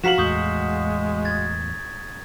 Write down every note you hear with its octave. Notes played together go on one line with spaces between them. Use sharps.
F3 F#4 F5 A#5 B6 E7 F#7
E2 A2 G#3 C#6 D#6 G6
G#6 A6